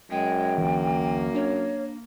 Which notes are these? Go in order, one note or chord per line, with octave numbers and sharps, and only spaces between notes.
F#2 G#3 G5
D2 E3 A#3
D4 C#5